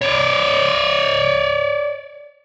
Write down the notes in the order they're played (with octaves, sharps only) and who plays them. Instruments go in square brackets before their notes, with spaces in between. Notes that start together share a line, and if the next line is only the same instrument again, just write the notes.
[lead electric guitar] C#5 D5